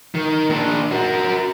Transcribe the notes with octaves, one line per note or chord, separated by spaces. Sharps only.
D#3
A#2 D4
F#4 A#4